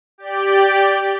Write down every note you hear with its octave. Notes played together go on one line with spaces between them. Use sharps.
G4 D5 G5